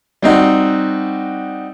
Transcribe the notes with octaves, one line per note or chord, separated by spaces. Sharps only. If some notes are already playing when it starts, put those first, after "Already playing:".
G3 C4 D#4 F#4